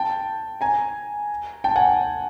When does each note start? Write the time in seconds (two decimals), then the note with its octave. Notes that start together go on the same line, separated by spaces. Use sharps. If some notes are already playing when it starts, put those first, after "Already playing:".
Already playing: G5 A5
0.61 G#5 A#5
1.64 G5 A5
1.76 F#5 G#5